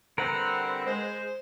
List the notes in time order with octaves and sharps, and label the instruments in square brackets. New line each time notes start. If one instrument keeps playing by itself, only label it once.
[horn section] D3 G3 C4 [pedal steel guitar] A#4 B4 F#5
[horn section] G#3 [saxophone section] C5